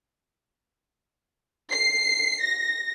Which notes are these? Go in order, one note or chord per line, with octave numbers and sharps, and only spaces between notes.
C7
A#6